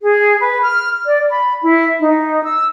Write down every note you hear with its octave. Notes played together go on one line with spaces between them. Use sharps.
G#4
B4
F6
D5
B5
E4
D#4
E6